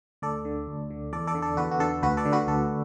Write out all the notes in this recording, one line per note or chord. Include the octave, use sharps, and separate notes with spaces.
D2 A4 D5
D3
D2
D3
E2 A4 D5
A4 D5
D3
A4 D5
E2 F#4 B4
F#4
D3 A4
D2 F#4 B4
A4 D5
D3
F#4 B4
D2 A4